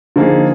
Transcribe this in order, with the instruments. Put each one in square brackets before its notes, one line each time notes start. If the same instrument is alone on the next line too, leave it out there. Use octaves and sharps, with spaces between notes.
[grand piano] D3 F3 A#3 D#4 G#4